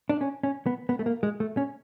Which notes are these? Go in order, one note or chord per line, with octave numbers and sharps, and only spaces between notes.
D4
C#4
C#4
B3
B3
A3
A#3
G#3
A3
C#4